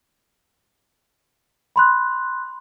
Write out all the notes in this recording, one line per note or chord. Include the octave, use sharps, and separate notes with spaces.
B5 C6 F#6